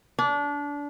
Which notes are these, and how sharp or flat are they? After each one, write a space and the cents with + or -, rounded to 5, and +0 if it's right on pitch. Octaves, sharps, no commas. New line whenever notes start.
D4 -25